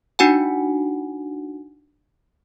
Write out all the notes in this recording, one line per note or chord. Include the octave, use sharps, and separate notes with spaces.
D4 D#4 F#4 F#5 G#5